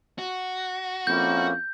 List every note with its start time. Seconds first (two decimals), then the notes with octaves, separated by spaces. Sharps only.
0.18 F#4
1.07 F2 A#3 C#4 E4 G6